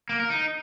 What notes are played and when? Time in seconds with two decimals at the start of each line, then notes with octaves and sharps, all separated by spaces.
0.09 A#3
0.20 A#4
0.30 D#4